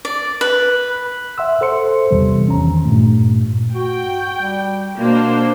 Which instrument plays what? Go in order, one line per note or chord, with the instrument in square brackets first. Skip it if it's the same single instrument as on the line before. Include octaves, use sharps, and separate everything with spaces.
[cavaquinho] D5
B4
[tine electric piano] E5 F#5 C6 E6
A4 C5 C6 C#7
A1 E2 C3 E3 G3
C#4 A#5
D#3
G2 A#2 A3
[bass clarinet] F#4 [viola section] G5
[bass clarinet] G3
[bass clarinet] B2 [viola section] A#3 D4 C5